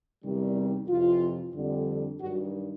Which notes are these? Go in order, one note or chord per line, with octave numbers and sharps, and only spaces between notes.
E2 C3 D#3 G3
F2 C3 E3 F4
F2 D3 G3
G2 D#3 F#3 F#4